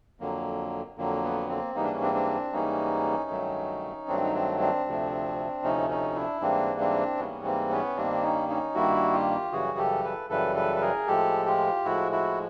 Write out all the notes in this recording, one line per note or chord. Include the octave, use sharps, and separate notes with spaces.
F2 D3 F#3 A#3
F2 D3 F#3 A#3
B3
A#3 C4
G#2 E3 G3 A#3 D#4
D4
C#4
C4 D4
C4 D4
G#2 E3 G3 A#3 C#4 D#4
G2 D#3 F#3 A3
G2 D#3 F#3 A3 C4 D4
D#4
C4 D4
C4 D4
D2 C3 F3 A3
D2 C3 F3 A3 C#4 D#4
C#4 D#4
D4 E4
G#2 E3 G3 A#3 C4 D4
C4 D4
G#2 E3 G3 A#3 B3 C#4
A#3 C4
B3 C#4
G2 D#3 G3 A#3 C4 D4
C#4 D#4
C#4 D#4
G2 D#3 G3 A#3 E4 F#4
F4 G4
F#2 C#3 E3 G3 F#4 G#4
G4 A4
A4 B4
F#2 C#3 E3 G3 A4 B4
A4 B4
B4
G#4 A#4
A2 F3 G#3 G4 A4
F4 G4
A2 F3 G#3 E4 F#4
E4 F#4